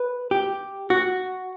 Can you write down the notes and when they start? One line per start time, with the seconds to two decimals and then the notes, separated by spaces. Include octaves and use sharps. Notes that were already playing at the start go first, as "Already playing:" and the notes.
Already playing: B4
0.31 G4
0.90 F#4